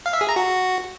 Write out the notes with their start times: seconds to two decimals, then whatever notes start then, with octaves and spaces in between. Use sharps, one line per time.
0.06 F5
0.13 E5
0.21 G#4
0.29 A#5
0.36 F#4